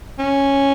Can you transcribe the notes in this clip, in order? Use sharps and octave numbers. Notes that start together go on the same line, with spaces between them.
C#4